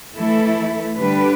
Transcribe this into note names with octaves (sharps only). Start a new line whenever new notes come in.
E3 A3 E4 A4
D3 G3 D4 G4 B4